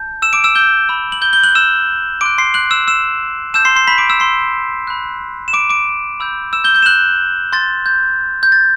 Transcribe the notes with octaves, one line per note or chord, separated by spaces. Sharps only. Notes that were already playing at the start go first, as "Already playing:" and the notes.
Already playing: A5 G6
E6 E7
D6 D7
E6 E7
G6 G7
B5 E6 G6
F#7
G6 G7
G6 G7
F#6 F#7
E6 E7
C6 D6 F#6 D7
C6 C7
F#6 F#7
E6 E7
E6 E7
A5 D6 E6 G6 E7
C6 C7
C6 C7
B5 B6
D6 D7
E6 E7
C6 C7
B5 F#6
E7
D6 D7
D6 D7
B5 E6 G6
E6 E7
G6 G7
G6 G7
E7
F#6 F#7
C6 G6 A6
G6
G6
A6